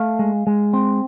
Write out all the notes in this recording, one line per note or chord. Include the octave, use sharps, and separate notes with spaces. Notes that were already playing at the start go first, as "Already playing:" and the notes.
Already playing: A3 F5
G#3
G#3
C4